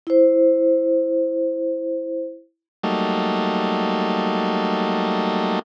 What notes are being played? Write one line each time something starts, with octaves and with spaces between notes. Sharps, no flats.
E4 C5
F#3 G3 A3 A#3 D#4